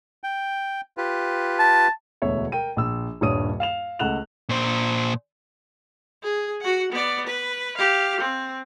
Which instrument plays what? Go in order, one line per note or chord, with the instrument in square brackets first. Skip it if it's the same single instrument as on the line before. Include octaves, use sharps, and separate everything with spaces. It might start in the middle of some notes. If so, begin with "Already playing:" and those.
[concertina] G5
F4 G4 B4
[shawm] A5
[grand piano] E1 D2 B2 C#5 E5
A#4 G5 D#7
A#1 E6
D#1 G2 C#5 D#6 D#7
F5 E7 F7
C#2 A3 F#5 F#6 E7 F7
[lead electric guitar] A#2 C5
[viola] G#4
F#4 F#5
B3 D5
B4
G4 F5
C4